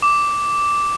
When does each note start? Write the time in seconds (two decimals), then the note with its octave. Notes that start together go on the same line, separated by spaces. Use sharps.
0.02 D6